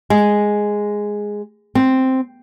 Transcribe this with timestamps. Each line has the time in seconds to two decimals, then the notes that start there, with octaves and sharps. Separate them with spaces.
0.10 G#3
1.75 C4